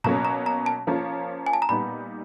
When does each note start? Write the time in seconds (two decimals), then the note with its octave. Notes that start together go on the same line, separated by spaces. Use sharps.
0.04 B2 F#3 A#3 C#4 A#5
0.25 A#5
0.46 A#5
0.66 A5
0.87 F3 A#3 C#4 F4
1.46 G#5
1.53 A5
1.62 A#5
1.69 A#2 G3 B3 D#4 B5